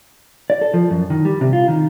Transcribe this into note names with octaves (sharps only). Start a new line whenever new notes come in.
D5
A4
F3
F#2
D#3
G3
C3
F4
D#3